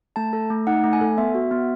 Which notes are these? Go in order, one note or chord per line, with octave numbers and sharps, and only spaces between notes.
A3 A5
A4
A3
D#4 F#5
A3
G#5
A4
B3 E5
F#4
B3